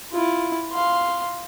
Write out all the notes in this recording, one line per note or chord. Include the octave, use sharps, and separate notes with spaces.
E4 F4
F5 C6